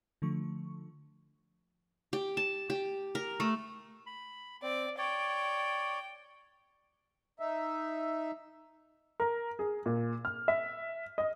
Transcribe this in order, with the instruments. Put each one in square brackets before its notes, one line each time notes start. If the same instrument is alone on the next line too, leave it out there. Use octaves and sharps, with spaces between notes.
[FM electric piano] D3 F3 A3 C#6
[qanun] G4
A5
G4
A#4
A3
[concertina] B5
[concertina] C4 [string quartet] D5
[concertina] C#5 D5 [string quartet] G5
[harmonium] D#4 E5
[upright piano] A#4
G#4
A#2
F6
E5
D#5